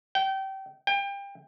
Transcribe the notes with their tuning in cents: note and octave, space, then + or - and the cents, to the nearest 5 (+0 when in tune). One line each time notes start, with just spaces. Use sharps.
G5 -25
G5 +30